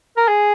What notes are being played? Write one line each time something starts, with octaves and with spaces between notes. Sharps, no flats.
A#4
G#4